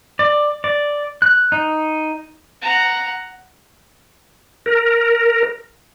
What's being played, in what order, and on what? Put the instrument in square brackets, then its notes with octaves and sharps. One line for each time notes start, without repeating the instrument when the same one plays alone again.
[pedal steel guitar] D5
D5
F#6
D#4
[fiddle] F#5 A#5
[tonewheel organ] A#4